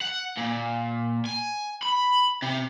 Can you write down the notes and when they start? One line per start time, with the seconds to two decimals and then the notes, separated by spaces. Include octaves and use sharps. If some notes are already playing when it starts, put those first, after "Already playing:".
0.01 F#5
0.38 A#2
1.26 G#5
1.83 B5
2.42 C3